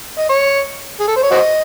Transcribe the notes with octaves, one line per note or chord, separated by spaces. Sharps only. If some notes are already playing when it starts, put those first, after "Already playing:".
D#5
C#5
G#4
A4
C5
C#5
F#4 C5 D#5